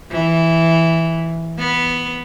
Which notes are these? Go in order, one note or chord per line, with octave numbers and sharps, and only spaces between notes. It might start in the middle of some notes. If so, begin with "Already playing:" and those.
E3
B3